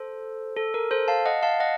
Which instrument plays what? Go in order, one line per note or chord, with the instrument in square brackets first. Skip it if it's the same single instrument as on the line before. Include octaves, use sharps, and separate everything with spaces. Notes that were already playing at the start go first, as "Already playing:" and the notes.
Already playing: [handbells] A4 C5
A4
A#4
A4 C5
F5 A5
D#5 F#5
F5 A5
D#5 F#5